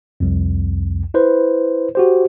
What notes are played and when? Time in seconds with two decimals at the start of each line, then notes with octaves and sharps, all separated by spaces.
0.20 C2 F2
1.14 E4 B4 C5
1.95 F#4 G4 C5